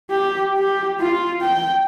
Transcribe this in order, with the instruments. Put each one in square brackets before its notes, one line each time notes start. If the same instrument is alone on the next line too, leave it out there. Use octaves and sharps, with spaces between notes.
[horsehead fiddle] G4
G4
F4
G5